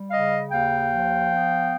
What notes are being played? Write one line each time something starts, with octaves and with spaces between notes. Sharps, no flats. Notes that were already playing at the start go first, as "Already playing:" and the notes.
Already playing: G3
C#3 D#5 F5
D#2 F5 G5
F3
B3